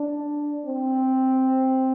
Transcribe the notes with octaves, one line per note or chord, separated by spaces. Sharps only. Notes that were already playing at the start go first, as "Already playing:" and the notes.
Already playing: D4
C4